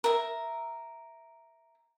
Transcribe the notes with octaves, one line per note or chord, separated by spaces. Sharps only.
A#4 E5